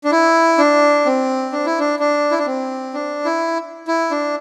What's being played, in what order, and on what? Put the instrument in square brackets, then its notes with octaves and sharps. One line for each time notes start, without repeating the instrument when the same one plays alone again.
[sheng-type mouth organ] D4
E4
D4
C4
D4
E4
D4
D4
E4
D4
C4
D4
E4
E4
D4